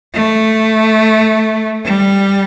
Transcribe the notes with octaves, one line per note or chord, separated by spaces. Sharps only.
A3
G3